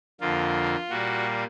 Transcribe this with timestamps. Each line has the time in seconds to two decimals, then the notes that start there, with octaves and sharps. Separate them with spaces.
0.21 F2 D3 F3 A#3 F4
0.90 A#2 G3 A#3 F#4